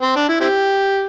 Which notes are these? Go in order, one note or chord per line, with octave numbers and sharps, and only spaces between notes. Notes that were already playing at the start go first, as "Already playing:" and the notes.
C4
D4
E4
C4 E4 G4